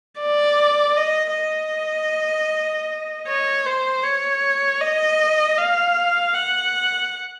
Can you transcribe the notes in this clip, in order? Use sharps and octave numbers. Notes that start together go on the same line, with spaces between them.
D5
D#5
D#5
C#5
C5
C#5
D#5
F5
F#5